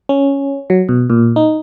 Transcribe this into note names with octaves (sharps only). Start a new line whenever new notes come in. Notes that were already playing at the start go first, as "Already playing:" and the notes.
C#4
F#3
B2
A#2
D#4